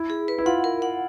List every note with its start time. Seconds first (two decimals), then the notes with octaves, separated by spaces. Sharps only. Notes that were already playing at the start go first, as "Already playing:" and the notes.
Already playing: E4
0.10 G#4
0.28 B4
0.38 E4
0.46 F4 F#5
0.64 A#4
0.82 F#5